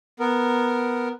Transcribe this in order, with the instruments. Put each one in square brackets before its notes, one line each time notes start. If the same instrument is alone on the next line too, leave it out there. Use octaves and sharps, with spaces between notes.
[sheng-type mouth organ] B3 A#4